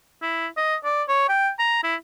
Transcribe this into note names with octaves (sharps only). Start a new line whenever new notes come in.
E4
D#5
D5
C#5
G5
A#5
E4